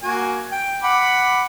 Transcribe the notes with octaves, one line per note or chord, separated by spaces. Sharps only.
A#3 F#4 G#5
G5
F#5 B5 D6